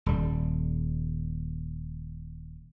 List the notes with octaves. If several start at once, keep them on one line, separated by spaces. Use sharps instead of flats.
D#1 G3